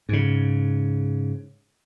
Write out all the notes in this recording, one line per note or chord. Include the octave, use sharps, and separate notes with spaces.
G#2 C#3